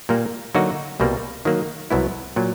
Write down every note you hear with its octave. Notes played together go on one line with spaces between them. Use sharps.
A#2 G3 A#3
D3 F#3 A#3 D#4 F#4
C2 B2 G3 A#3
D#3 F#3 A#3
C2 B2 F#3 B3 E4
A#2 F#3